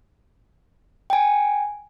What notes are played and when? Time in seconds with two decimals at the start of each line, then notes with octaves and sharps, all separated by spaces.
1.10 G5 G#5